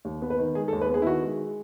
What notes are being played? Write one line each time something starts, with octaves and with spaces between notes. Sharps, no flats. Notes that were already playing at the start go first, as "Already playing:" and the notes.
D#2
B3
B4
D#3
G#3 G#4
A4
D#2
B4
B3 G#4
E4
D#3 F#4
G#3